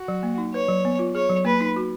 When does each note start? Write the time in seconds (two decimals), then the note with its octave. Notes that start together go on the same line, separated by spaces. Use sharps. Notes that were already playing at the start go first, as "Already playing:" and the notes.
Already playing: F#4
0.08 F#3
0.23 A#3
0.38 D#4
0.54 B4 C#5
0.68 F#3
0.85 B3
0.99 F4
1.15 G#4 C#5
1.30 F#3
1.45 A#3 B4
1.61 D#4
1.76 F#4